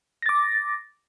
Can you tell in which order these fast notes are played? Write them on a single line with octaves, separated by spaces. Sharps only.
A#6 A6 D6